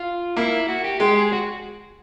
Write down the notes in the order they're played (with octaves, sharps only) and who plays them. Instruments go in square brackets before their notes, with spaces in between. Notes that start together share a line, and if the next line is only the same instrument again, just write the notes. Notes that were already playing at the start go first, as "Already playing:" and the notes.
Already playing: [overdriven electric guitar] F4
[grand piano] A#3 [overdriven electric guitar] E4
[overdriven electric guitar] F#4
G4
[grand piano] G#3 [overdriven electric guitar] G4
[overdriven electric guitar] G#4
F#4